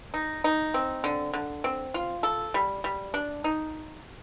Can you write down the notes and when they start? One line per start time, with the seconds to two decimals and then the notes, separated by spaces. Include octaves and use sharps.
0.14 D#4
0.44 D#4
0.74 C4
1.04 D3
1.33 D3
1.64 C4
1.94 F4
2.23 A4
2.54 G3
2.84 G3
3.14 D4
3.44 D#4